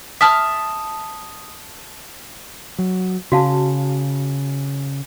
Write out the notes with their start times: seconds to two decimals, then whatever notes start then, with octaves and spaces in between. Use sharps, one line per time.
0.21 E5 A5 D#6 F6
2.79 F#3
3.32 C#3 F#4 F5 A5